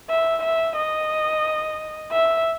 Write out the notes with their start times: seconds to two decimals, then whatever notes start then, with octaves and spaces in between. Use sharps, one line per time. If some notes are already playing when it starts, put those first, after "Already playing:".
0.09 E5
0.43 E5
0.76 D#5
2.11 E5